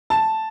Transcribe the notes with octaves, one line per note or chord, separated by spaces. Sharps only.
A5